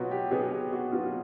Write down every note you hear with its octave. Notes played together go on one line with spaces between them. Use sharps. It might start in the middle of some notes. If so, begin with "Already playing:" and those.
Already playing: B2 F#3 B3 F4 F#4
G4
B2 F#3 B3 G#4
G4
F#4
B2 F#3 B3 F4